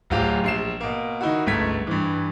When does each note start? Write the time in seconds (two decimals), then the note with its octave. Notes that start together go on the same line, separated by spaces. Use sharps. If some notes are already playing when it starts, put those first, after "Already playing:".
0.10 D1 F#3 F4 G4
0.44 A#1 C7 E7
0.80 B2 A#3
1.21 D#3 D#4 E4 F#4
1.46 G1 C#2 A3 G#6 B6
1.87 G2 E3